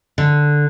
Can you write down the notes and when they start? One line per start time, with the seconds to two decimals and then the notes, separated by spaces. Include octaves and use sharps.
0.18 D3